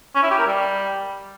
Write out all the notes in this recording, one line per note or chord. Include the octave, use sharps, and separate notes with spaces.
C#4
E4
G4
A#4
G3